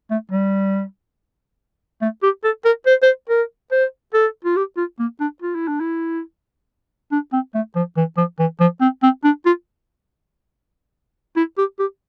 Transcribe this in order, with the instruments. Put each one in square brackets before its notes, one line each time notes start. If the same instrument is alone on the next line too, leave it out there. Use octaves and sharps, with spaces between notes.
[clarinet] A3
G3
A3
G4
A4
A#4
C5
C5
A#4
C5
A4
F4
G4
F4
A#3
D4
F4
E4
D4
E4
D4
C4
A3
F3
E3
F3
E3
F3
C4
C4
D4
F4
E4
G4
G4